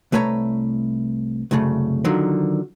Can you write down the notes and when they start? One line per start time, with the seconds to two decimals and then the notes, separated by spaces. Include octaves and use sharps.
0.12 C2 A3 B4 C#5 A#5
1.51 C2 F#2 C#3 A3
2.05 D3 D#3 F3 F#3